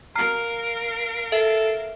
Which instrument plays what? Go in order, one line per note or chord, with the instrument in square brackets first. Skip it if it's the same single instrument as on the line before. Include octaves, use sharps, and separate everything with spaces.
[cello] A#4 F5 [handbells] A#5 F6 C7
[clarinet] A4 [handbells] E5